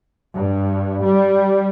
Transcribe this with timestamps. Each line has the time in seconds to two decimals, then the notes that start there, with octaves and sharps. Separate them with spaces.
0.35 G2
1.04 G3